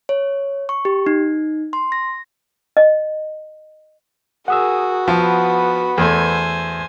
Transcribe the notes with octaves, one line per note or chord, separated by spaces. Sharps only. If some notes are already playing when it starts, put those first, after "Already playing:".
C#5
C#6
G4
D#4
C6
A#6
D#5
F#4 G#4 A#4 F#5 D#6 E6
F3 B3 B5
E2 A3 C5 G#5